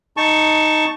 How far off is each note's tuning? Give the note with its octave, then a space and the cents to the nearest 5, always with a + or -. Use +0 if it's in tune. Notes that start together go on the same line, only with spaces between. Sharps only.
D#4 +0 A5 +10 C#6 +0